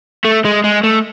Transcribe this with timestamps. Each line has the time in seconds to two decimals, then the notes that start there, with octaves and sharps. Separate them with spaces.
0.25 A3
0.45 G#3
0.64 G#3
0.83 A3